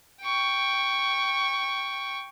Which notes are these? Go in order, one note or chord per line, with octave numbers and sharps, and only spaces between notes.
G5 C#6